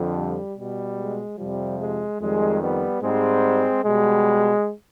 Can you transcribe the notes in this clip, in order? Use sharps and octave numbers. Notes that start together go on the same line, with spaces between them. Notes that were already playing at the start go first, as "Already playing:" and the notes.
Already playing: F2 D3 F3
G3
B2 G3
G#3
F2 C3 F3 G3
G#3
F2 D#3 G3 G#3
G3 B3
G#2 G3 G#3 C4
B2 G3 G#3